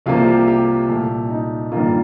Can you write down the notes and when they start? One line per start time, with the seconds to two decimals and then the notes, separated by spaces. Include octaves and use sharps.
0.06 C2 C3 F3 A#3 F4
0.27 G4
0.47 G4
0.89 C2 A#2 A3
1.30 D#4
1.72 G2 D#3 A#3 F4